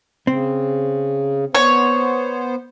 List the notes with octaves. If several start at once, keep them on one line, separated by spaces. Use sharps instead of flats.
C#3 C4
B3 C5 C#5